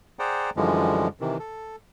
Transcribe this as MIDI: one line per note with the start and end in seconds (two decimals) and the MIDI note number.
0.19 0.50 68
0.19 0.50 72
0.19 0.50 74
0.19 0.50 78
0.19 0.50 79
0.19 0.50 82
0.57 1.08 42
0.57 1.08 50
0.57 1.08 52
0.57 1.08 53
0.57 1.08 55
0.57 1.08 56
1.21 1.38 48
1.21 1.38 51
1.21 1.38 52
1.40 1.76 69